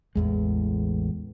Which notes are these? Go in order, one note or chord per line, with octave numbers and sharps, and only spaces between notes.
A1 E2 G#3